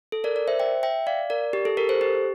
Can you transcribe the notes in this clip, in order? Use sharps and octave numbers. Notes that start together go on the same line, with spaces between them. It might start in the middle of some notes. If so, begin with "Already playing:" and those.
A4
A#4 D5
A#4 D5
C5 E5
E5 G5
E5 G5
D5 F5
A#4 D5
G4
A4
G4 A#4
A4 C5
G4